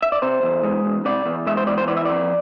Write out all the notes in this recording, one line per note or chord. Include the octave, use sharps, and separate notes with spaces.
E5
D5
C3 C5
E2
G#3
E2
C3 D5
E2
G#3 E5
C5
E2 D5
C5
E3 D5
E5
F2 D5